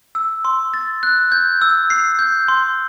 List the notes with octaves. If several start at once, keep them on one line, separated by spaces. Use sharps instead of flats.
E6
C6
A6
F#6
G6
E6
C7
G6
C6